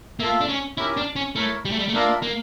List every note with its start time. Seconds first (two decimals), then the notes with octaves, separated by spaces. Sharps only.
0.20 A#3 F4 A4 E5
0.41 D4
0.49 C#4
0.77 C#4 E4 G4 A#4
0.97 D4
1.16 C#4
1.36 A3 E4 A#4 C#5
1.65 G3
1.72 A3
1.79 G3
1.88 A3
1.94 A#3 D4 F4 A#4 E5
2.23 A#3